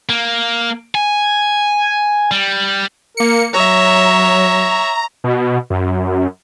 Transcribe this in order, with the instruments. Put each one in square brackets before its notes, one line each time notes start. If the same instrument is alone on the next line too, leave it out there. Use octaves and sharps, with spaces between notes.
[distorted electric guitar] A#3
G#5
G3
[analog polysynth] A#3 C#7 [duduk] A#4
[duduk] F#3 [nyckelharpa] C#5 E5 [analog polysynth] A#5
[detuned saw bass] B2
F#2